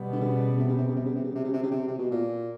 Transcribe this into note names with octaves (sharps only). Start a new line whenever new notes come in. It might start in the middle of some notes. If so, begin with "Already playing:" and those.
Already playing: B2 G3 B3
D3
C#3
C3
C#3
C3
C#3
C3
C#3
C3
C#3
C3
C#3
C3
C#3
C3
C3
B2
A#2